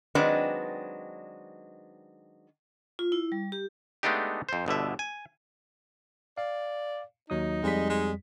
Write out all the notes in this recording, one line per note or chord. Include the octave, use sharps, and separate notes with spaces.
D#3 F#3 G#3 C4 D4 B4
F4
E4
G3
G4
G#3 A3 B3 D4 D#4 G4
F2 C5
G1 B2 D3 E5
G#5
D5 F5
D#2 F#3 D#4 D#6
F2 G3 G#3 B6
G#3